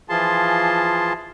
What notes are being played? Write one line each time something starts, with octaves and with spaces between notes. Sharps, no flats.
E3 F3 F4 G#4 A5 C6